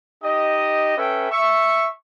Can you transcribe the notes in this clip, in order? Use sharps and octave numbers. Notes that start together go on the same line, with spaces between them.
D#4 G4 D#5
C#4 A4 B4 E5 G5
E5 C#6